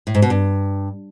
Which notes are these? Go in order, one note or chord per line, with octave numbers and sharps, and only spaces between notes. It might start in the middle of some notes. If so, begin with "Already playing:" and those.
A2
G#2
B2
G2